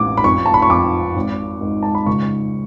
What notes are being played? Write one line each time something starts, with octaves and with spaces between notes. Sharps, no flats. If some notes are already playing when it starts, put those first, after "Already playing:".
Already playing: A1 D6
B5
F2 C#6
A5
B5
C#6
F2 D6
G#1
G#2
A5
B5
C#2 C#6